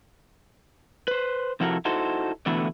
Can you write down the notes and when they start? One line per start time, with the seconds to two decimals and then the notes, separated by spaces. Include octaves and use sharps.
1.08 B4 C5
1.60 C3 F3 E4 F#4 A4 A#4
1.85 D#4 E4 F#4 A4 C5
2.46 B2 D3 E3 A3 B3 E4